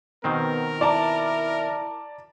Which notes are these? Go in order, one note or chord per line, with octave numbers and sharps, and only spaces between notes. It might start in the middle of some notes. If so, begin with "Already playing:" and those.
B2 D#3 B3 C4 A#4
E4 D5 A5 A#5